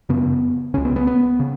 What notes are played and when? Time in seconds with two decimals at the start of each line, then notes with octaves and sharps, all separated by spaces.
0.09 F#2 C#3 B3
0.74 C#3 C#4
0.77 C#2
0.85 B3
0.96 B3
1.07 B3
1.40 C#3